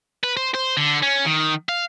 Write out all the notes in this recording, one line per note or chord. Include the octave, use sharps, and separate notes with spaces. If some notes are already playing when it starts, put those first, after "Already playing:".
B4
C5
C5
D3
C#4
D#3
F5